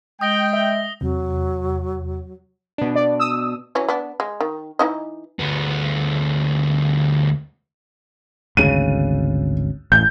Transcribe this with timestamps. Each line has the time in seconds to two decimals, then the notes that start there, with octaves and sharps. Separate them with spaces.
0.21 G#3 G5 D#6 A#6 G7
0.53 E5
1.01 E2 C3 F#3
2.78 B2 D4
2.96 D5
3.19 D#6 E6
3.75 E3 F#3 C#4
3.89 B3 D4
4.20 G#3
4.41 D#3
4.79 E3 D#4 D#5
5.39 D2 B3
8.57 G#1 D2 C#3 D#7
9.92 A1 G6